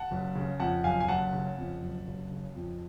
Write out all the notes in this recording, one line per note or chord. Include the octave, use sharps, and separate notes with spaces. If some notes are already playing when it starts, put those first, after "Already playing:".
Already playing: F#5 A5
F#1
C#3
F2 F#5 A5
F#1 F5 G#5
G#5
F#1 F#5 A5
C#3
F2
F#1
F#1
C#3
F2